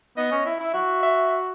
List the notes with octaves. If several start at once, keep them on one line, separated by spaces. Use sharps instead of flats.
B3 D#5
C#4
E4 E5
E4
F#4 E5
E5